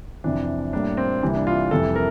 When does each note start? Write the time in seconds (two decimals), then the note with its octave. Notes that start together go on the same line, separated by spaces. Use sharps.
0.24 F2 C3 E3 D4
0.73 A2 G3 A#3 D4
0.97 C4
1.22 C2 C3 E3 G3 A#3
1.35 D4
1.47 F4
1.71 F2 C3 E3 G3 A4
1.95 A#4